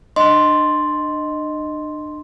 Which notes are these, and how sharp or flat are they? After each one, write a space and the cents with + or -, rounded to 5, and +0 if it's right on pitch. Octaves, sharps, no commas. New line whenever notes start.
D4 +40 D#5 +0 C6 +0